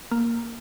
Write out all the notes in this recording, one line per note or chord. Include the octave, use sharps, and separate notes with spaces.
A#3